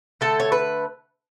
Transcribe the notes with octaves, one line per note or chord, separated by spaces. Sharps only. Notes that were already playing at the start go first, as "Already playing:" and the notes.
D3 A3 A4
C#5
B4